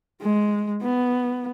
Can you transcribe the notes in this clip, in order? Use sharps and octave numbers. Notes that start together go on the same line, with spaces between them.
G#3
B3